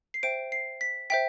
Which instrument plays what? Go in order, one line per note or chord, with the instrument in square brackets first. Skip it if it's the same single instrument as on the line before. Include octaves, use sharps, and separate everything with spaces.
[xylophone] C7
C5 E5 G5 D7
C7
B6
C5 E5 G5 B6